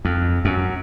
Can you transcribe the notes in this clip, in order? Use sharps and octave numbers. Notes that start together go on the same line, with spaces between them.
F2
F#2